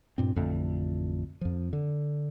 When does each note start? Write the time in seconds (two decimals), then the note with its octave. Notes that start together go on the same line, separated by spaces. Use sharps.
0.18 G2 A#2 C4
0.36 A1 F2 D3 A3
1.41 F2 F3
1.73 D3